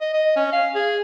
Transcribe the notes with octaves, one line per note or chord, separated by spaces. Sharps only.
D#5
D#5
C#4
F5
G#4